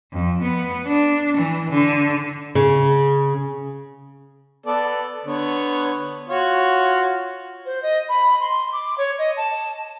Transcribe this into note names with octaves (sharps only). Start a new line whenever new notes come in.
F2
B3
D4
E3
D3
C#3
B3 A4 D5
D3 B3 C#5
F4 F#4 C#5
C5
D#5
B5
C6
D6
C#5
D#5
A5